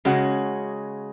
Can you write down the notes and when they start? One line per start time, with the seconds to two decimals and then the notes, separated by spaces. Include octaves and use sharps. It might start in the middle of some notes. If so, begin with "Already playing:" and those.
0.05 C#3 G#3 C#4 F#4